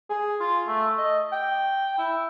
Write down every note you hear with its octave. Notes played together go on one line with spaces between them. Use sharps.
G#4
F4
A3
D#5
G5
E4